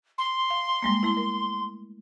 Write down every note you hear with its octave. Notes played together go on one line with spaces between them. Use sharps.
C6
F5
G3 G#3 A#3
A3 E4
A#4